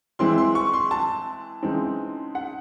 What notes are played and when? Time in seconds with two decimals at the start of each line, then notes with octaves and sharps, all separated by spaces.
0.19 E3 G#3 C4 E4 C6
0.38 C6
0.55 C#6
0.73 C6
0.91 A5
1.63 C#3 E3 G#3 C4 D#4
2.35 F#5